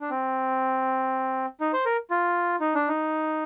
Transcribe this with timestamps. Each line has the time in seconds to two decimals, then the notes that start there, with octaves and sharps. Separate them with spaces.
0.01 D4
0.11 C4
1.61 D#4
1.73 C5
1.86 A#4
2.11 F4
2.60 D#4
2.75 D4
2.88 D#4